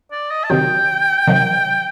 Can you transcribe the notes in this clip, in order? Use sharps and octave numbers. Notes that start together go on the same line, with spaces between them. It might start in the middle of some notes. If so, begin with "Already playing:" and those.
D5
D#5
A5
C3 D#3 F#3 G5
C3 D#3 F#3